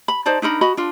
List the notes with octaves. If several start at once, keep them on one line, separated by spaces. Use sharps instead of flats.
B5
D#4 C5 D5 A5
D4 D#4 A#4 B5
F#4 D#5 B5
D4 F4